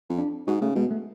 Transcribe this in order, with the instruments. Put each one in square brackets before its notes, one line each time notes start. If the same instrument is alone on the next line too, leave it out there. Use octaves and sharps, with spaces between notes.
[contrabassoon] F2
[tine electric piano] D4
[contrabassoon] G#2 [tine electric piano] F#4
[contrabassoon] C#3 [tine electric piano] A3
[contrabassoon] B2 [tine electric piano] G#3
[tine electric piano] A3